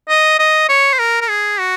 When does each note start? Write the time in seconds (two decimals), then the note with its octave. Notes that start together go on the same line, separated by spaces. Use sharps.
0.09 D#5
0.39 D#5
0.69 C#5
0.93 C5
0.99 A#4
1.21 A#4
1.29 G#4
1.60 F#4